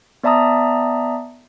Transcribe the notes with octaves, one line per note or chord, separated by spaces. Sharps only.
B3 D5 E5 A5 A#5 D#6